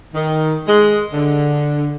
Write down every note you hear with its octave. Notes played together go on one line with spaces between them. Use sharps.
D#3
G#3
D3